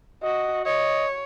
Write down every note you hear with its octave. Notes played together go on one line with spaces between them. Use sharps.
F#4 D#5
C#5 D#5